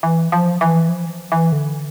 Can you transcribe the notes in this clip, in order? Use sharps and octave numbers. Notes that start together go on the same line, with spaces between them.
E3
F3
E3
F3
E3
F3
E3
D3